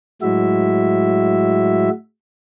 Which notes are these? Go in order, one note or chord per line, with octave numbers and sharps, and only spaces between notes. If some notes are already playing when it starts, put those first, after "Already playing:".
A2 F#3 G#3 E4 F#4 E5